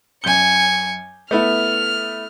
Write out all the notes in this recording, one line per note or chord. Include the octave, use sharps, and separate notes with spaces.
F#2 G#5 G6 C#7 G7
A3 B3 E4 F6